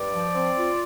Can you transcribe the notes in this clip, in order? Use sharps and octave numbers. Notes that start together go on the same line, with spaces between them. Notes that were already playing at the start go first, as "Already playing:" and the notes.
Already playing: G2 D5
F3
C4
F4